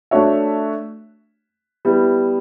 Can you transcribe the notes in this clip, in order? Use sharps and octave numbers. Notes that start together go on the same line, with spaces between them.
A3 D4 F#4 C#5 E5
G3 B3 E4